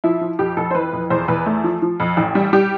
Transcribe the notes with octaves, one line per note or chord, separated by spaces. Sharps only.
F3 E4
F3
F2 G4
F2 A4
C5
E3 B4
F2
E2 C5
E2 B4
A3
F3
F3
F2
A1
G3
G3 G4